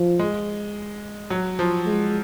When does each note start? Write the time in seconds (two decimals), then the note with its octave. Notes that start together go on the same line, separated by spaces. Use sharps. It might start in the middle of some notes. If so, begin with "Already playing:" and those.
Already playing: F3
0.19 G#3
1.30 F#3
1.59 F3
1.86 G#3